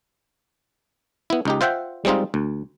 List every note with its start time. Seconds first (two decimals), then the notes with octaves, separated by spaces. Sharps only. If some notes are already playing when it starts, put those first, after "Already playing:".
1.30 B3 E4
1.45 C#2 D#4 G4
1.61 F4 C5 E5 F#5 G5
2.05 G3 G#3 C4 D#4 F4
2.34 D2